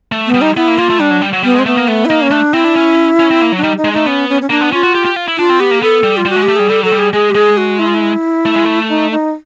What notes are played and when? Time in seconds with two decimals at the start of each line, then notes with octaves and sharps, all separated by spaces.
0.12 A3
0.27 B3
0.34 G3
0.41 D#4
0.56 B3 E4
0.68 A#3
0.78 A#3 F4
0.90 A3
0.99 G3 D4
1.11 F#3
1.21 G3
1.33 F#3
1.43 G3 B3
1.54 G#3
1.59 C4
1.66 A3 B3
1.77 A#3
1.88 A3 B3
2.05 E4
2.09 A#3 D#4
2.22 C#4
2.31 A3 D4
2.53 C4 E4
2.64 D4
2.76 C#4
3.19 C#4
3.31 C4
3.42 A#3
3.52 F#3
3.58 D4
3.63 G3 D#4
3.78 D#4
3.85 G#3
3.93 A3 D#4
4.06 B3 C#4
4.29 C#4
4.42 C#4
4.50 A#3 D4
4.61 B3
4.72 C#4 F4
4.83 F#4
4.95 G4
5.05 G4
5.16 F4
5.28 E4
5.38 D4 F4
5.50 C4
5.60 B3 G4
5.71 A#3
5.82 B3 A4
6.03 G3
6.17 F4
6.25 G3 F#4
6.36 G#3
6.43 G4
6.48 A3
6.56 G3 G#4
6.69 G3 A4
6.83 F#3 A4
6.92 G3
6.99 G#4
7.13 G#3 G#4
7.30 G4
7.35 G#3 G#4
7.57 F#4
7.79 E4
7.87 F4
7.94 E4
8.45 A3
8.56 G#3
8.65 A3
8.89 D#4
9.11 D#4